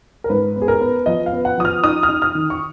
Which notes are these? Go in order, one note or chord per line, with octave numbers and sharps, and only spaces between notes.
A#4
G#2 B4
B3
G#4
A#4
B3
F3 D#5
F5
B3
F#5
F3 D#6
F6
D#4 D#6
F6
D#4
F6
D#3
C#6